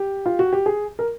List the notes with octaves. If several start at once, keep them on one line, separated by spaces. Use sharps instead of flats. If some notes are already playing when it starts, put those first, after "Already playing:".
Already playing: G4
F4
F#4
G4
G#4
A#4